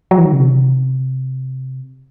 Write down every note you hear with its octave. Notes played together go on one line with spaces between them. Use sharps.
F#3
E3
D#3
C#3
C3